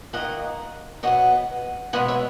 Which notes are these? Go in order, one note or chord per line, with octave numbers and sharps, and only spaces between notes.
D#2 D#3 A#3 D#5 F#5
B2 F#3 B3 D#5 F#5
B2 G#3 B3 D#5 F#5
C#5 E5